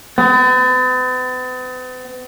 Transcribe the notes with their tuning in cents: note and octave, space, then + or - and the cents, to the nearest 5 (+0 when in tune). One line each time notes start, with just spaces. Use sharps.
B3 +45